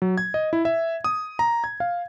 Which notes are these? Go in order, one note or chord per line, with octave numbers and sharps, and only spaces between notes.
F#3
G#6
D#5
E4
E5
D#6
A#5
G#6
F5